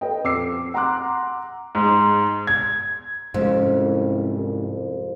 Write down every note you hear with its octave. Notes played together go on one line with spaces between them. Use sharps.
A4 B4 D#5 G5
F2 D6 E6 C7
F#5 A#5 C6 D6 F#6
G#2
G#6
C2 F2 G#2 G#3 C#4